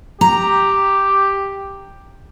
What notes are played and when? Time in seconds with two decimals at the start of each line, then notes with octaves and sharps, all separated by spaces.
0.21 G4 A#5